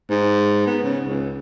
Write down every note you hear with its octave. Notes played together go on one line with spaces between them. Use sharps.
G#2
B3
C#3
C#2